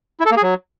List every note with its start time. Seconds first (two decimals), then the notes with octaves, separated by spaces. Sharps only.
0.20 E4
0.26 A4
0.31 A#3
0.37 G#4
0.43 F#3